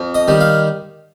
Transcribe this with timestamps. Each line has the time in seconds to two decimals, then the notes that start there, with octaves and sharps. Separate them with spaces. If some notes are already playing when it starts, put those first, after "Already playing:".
Already playing: F2
0.14 D#5
0.28 D#3 G3
0.41 F5